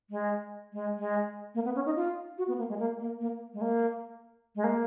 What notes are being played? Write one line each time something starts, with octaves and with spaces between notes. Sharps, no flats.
G#3
G#3
G#3
A#3
B3
C#4
D#4
F4
F#4
B3
A#3
G#3
A#3
A#3
A#3
G#3
A#3
G#3
A#3